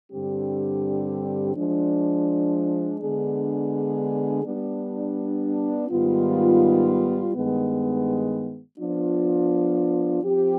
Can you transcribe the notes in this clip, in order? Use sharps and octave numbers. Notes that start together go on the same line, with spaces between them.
G2 D3 G3 C4 G4
F3 G#3 D4
D3 G#3 B3 D4 G#4
G3 B3 D4
G#2 D#3 G3 B3 F4
G2 D#3 G#3 B3
F3 B3 D4 F4
F3 C4 G4